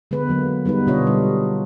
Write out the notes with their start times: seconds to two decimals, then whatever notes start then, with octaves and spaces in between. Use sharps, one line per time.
0.11 D3 G#3 B3 B4
0.29 F#3 A#3 B3
0.65 G3 B3 D#4 B4
0.87 B2 D3 D4 F4 C#5 D#5
1.07 G3